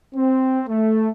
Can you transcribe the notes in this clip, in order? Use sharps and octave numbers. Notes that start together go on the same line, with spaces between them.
C4
A3